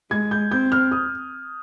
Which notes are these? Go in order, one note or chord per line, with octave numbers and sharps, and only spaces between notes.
G#3 G#6
G6
C4 G6
F6
D#6